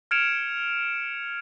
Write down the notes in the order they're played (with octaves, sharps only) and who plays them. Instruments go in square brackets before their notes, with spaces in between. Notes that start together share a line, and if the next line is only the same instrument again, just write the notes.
[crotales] F6 G#6 C#7 D7 E7 F7